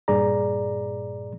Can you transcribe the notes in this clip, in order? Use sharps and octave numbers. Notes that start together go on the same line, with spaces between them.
G2 A#2 G#4 D5 A#5